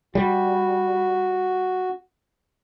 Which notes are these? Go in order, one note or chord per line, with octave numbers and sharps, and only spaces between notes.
G3 F#4